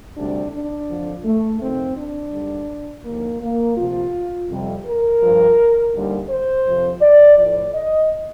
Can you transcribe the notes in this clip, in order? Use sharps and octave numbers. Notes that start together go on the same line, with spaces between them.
D2 C3 G3 D4
D4
F2 D3 F3
A3
F2 C3 D#3 C4
D4
D#2 D3 G3
D#2 D3 F3 A#3
A#3
D2 C3 F3 F4
F2 C3 G3
A#4
G2 F3
D#2 D3 G3
C5
F2 C3 F3
D5
A2 F3 D5
D#5